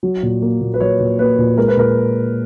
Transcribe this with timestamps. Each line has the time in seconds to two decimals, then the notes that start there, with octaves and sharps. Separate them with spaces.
0.03 F#3
0.23 A#2
0.42 A#3
0.61 A#2
0.74 B4
0.80 F#3 C#5
1.00 A#2
1.19 A#3 B4
1.38 A#2
1.58 G#3 A#4
1.68 B4
1.77 A#2 A#4